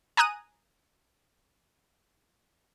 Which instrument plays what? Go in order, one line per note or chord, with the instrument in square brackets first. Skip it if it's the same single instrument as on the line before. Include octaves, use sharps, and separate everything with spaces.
[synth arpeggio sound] G#5 A#5 D#6 F#6 D#7